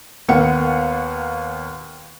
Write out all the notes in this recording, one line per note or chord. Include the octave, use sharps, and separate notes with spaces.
D#2 A#3 B3 F#5 C#7